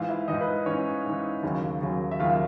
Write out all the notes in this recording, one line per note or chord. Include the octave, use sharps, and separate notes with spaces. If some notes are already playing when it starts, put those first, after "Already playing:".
Already playing: G#2 E3 F4 F5
E4 E5
G#2 E3 D#4 D#5
B4
G#2 E3 C#4 C#5
G#2 E3
D#2 C#3 F#3
D#2 C#3 F#3
E5
D#2 C#3 F#3 F4 F5